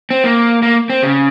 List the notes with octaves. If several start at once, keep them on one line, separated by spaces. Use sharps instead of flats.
C4
A#3
A#3
C4
C#3